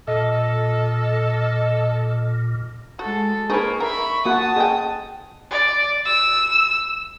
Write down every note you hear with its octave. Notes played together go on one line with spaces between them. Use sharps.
A#2 A4 D#5
G#3 F#4 A4
A#3 D#4 G#4 B4 C5 G#5 C#6
A#4 E5 B5
A#3 F#4 F#5 A5 D#6
G#4 A4 D#5 F#5 G5
D5
E6